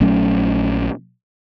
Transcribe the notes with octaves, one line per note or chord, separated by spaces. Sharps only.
A#1 F#3 A3 C#4